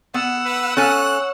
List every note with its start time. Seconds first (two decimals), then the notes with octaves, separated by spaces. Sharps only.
0.14 B3 F#5 E6
0.46 B4
0.77 C#4 A4 C#5 G#5 F#6